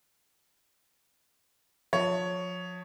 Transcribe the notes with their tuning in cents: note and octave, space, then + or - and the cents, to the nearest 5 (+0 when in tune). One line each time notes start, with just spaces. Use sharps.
F3 +30 C#5 +10